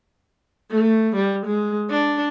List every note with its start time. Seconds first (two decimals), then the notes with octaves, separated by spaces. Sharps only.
0.71 A3
1.16 G3
1.46 G#3
1.90 D4